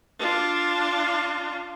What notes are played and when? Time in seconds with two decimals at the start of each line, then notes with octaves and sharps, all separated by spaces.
0.19 D4 F4